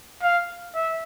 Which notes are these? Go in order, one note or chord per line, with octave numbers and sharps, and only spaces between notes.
F5
E5